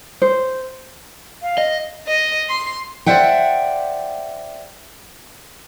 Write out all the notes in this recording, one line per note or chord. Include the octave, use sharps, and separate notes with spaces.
C5
F5
D#5
D#5
C6
C5 D5 E5 F#5 G5